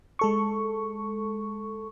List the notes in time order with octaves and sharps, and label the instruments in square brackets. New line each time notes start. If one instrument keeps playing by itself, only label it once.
[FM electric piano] G#3 A4 C#6